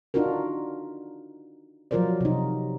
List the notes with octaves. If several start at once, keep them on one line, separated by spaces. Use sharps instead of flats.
D4 D#4 F4 F#4 A#4
F3 F#3 F4 A#4 C5 D5
C3 D#4